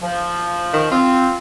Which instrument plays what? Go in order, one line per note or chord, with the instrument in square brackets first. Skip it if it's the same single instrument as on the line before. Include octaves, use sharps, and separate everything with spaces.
[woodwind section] F3
[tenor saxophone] D#3
[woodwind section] C4 [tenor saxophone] F4